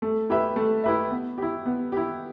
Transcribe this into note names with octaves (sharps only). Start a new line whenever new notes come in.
A3
E4 G4 B4 E5
A3
E4 G4 B4 E5
B3
E4 G4
B3
E4 G4